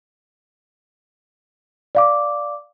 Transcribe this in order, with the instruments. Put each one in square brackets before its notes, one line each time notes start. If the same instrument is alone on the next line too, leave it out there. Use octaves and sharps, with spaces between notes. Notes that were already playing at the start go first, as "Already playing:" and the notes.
[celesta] D5 F5 D6